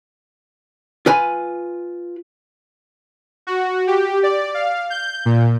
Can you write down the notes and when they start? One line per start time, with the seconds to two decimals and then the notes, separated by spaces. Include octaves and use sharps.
1.06 F4 B4 G#5
3.47 F#4
3.87 G4
4.23 D5
4.54 F5
4.90 G6
5.25 A#2